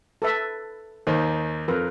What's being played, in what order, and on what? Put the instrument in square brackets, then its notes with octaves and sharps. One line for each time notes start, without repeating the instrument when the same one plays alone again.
[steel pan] A4 B4 E5
[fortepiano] D#2 D#3 [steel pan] C5
[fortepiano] F2 [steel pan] A#4 B4